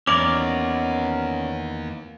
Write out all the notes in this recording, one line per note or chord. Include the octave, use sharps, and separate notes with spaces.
E2 A#3 B3 C#4 D#4 A#4 D5 D6